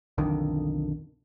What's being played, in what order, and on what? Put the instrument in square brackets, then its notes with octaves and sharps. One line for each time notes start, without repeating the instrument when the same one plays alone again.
[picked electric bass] B1 F2 D3 D#3